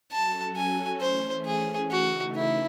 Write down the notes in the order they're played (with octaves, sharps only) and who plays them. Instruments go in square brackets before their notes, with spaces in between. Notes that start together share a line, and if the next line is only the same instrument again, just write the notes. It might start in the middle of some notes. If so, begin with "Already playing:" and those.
[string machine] F#3 C#4 F#4 A4 [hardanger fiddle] A5
[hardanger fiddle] G#5
[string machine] E3 A3 C#4 [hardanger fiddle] C5
[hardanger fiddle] G#4
[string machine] C#3 E3 A3 D#4 [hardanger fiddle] F#4
[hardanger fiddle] E4